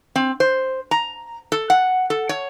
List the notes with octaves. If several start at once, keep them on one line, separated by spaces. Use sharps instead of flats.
C4
C5
A#5
A4
F#5
A4
C#5